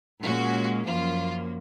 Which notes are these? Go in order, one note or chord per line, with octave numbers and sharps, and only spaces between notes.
A#2 G#3 C#4 F#4
F#2 F3 A#3 F4